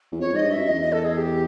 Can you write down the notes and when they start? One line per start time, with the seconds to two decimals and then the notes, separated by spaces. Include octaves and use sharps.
0.12 E2
0.20 F2 C#5
0.32 G#2 D#5
0.44 G2
0.52 F#2 E5
0.68 E2 D#5
0.81 D#5
0.92 A4
1.05 G#4
1.17 G4